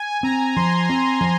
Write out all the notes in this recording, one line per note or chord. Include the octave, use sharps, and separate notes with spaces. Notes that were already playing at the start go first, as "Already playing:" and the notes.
Already playing: G#5
C4 A#5
F3 C6
C4 A#5
F3